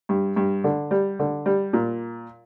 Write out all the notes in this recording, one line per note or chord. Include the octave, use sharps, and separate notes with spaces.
G2
G2
D3
G3
D3
G3
A#2